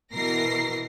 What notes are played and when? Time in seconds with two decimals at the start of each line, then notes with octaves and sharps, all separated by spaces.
0.14 B2 E3 A#4 A#6 C7